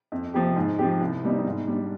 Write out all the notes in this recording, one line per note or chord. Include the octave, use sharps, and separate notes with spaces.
F2
C3 F3 C4 G4
G#2
F3 C4 G4
C2
B2 G3 C4 D#4
G#2
G3 D4